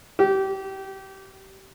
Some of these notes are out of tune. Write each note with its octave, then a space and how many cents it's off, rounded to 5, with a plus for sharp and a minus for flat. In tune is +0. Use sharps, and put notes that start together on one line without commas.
G4 -25